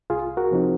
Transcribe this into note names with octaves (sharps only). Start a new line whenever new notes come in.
C2 F4 G#4
F#4 A#4
C3 F3 C4 D#4